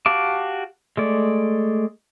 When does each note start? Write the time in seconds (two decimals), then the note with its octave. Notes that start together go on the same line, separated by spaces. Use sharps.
0.06 F#4 G4 F5 A5 D6
0.97 G#3 A3 D5